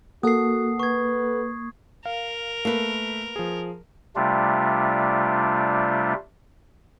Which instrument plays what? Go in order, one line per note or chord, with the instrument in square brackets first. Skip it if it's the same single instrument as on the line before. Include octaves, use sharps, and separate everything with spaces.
[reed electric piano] A#3 [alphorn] F#4 [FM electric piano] A4 F#5 [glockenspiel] D#6 C7
[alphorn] B4 [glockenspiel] C#6 G#6
[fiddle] A#4 [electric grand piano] F5
[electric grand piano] A3 [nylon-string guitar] A#3 B4
[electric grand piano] F3 G#4
[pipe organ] C3 G3 A3 D4 F4